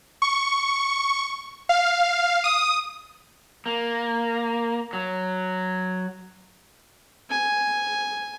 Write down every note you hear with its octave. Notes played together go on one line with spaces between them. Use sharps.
C#6
F5
D#6
A#3
F#3
G#5